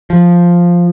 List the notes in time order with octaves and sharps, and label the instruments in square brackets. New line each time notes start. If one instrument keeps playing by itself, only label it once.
[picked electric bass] F3